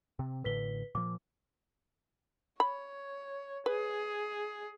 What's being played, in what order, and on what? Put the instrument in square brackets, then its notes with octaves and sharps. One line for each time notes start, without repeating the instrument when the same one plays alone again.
[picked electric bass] C3 C4
[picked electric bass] A1 A2 D3 [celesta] B4 B6 G7
[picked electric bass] A#2 F3 [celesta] D6
[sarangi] C#5 [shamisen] B5
[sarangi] G#4 [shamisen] B4